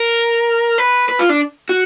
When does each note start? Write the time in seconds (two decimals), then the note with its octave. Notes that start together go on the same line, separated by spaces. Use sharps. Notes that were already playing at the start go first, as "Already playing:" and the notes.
Already playing: A#4
0.78 B4
1.09 B4
1.19 F4
1.29 D4
1.69 F#4